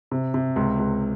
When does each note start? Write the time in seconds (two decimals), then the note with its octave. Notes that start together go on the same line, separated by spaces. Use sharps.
0.11 C3
0.34 C3
0.56 C#2
0.79 C#2